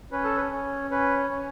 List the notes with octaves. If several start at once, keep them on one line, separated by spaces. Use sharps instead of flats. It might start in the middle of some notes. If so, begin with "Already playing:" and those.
C#4 B4
A4
B4
C#4
C#4 B4
C#4